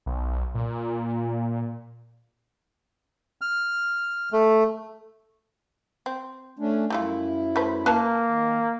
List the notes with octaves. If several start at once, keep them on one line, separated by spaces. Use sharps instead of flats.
B1
A#2
F6
A3
C4
A3 C#4 D4
F#2 G3 A3 E4 F4
A3 B4 C5
A#3 B4 F5 A5
D#3